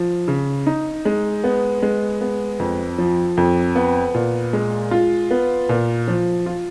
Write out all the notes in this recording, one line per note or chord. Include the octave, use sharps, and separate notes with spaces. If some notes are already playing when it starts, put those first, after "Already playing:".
Already playing: F3
C#3
D#4
G#3
B3
G#3
B3
F2
F3
F2
B3
A#2
G#3
F4
B3
A#2
F3
F4